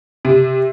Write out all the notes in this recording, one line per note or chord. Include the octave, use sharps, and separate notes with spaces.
C3